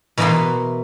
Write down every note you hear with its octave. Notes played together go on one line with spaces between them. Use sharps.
B2 E3 A#3 B4 F#5 C6